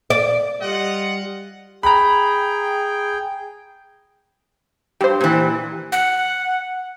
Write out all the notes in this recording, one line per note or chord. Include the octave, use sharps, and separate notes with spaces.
D5
G3 F4 D#5 F#5
G#4 G5 A#5 B5
G2 G4 C5
A#2 E3
F#5